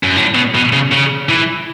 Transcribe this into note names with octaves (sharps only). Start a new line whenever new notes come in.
F#2
A2
B2
B2
C#3
C#3
E3